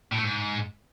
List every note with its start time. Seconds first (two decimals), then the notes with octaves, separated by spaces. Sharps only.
0.12 A2
0.17 A3
0.23 G#2